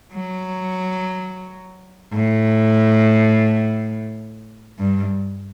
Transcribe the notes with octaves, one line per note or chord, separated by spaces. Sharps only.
F#3
A2
G2